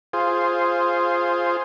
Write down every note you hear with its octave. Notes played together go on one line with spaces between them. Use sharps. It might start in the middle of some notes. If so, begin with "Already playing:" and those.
F4 G#4 C5